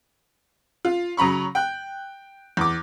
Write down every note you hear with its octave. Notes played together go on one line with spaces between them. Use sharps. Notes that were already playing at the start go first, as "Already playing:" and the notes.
F4
C#3 F#3 A#5 B5 C#6
G5 F#6
E2 D6